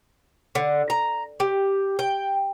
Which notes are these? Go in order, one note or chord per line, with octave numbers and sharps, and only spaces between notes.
D3
A#5
G4
G5